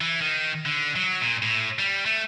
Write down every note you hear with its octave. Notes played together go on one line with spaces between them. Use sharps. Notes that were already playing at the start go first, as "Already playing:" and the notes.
E3
D#3
D3
F#3
A#2
A2
G3
A3